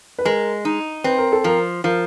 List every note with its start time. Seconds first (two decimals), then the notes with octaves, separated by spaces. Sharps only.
0.18 B4
0.25 G#3 A#4
0.65 D#4
1.04 C4 B4
1.18 A#4
1.32 A4
1.44 F3 A#4
1.84 F3 A#4